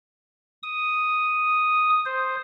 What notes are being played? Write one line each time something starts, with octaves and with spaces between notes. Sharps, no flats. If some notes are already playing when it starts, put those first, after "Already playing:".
D#6
C5